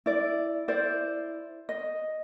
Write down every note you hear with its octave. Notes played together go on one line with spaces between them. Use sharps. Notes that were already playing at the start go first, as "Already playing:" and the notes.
E4 D5
E4 C5 D5
D#5